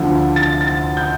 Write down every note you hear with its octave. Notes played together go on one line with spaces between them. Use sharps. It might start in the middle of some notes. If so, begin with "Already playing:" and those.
Already playing: D2 D3 F3
A6
A6
G6